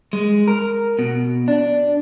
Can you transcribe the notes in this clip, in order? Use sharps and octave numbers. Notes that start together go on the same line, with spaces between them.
G#3
A#4
B2
D4